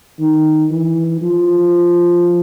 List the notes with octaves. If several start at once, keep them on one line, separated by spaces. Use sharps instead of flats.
D#3
E3
F3